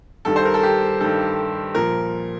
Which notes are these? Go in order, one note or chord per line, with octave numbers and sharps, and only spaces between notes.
G2 D#3 G3 A4
C5
A#4
A4
G4
G2 D#3 G3 A4
A#2 F3 A#4